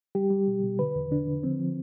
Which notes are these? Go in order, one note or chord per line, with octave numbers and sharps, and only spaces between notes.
G3 G4
G3
B2
B2
D3 B4
E2
D3 D4
D3
F3 C4
F3